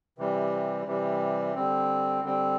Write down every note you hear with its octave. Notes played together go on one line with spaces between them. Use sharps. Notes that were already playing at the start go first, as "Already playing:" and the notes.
C3 E3 G3
C3 E3 G3
D3 G3 C4
D3 G3 C4